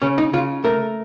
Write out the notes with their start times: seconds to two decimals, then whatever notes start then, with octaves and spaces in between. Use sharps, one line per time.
0.02 C#3 C#4
0.18 D#4
0.33 C#3 F4
0.64 A3 A#4